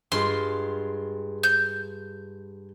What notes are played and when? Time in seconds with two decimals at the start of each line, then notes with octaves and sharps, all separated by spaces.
0.12 G2 G#3 F4 C6
1.43 G6